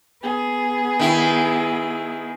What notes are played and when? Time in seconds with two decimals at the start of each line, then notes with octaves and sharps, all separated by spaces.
0.22 B3 G#4
0.99 D#3 E4